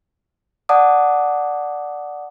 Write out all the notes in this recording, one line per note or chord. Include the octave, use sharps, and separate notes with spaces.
D5 F#5 A5 D6 D#6